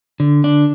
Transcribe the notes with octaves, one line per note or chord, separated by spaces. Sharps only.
D3
D4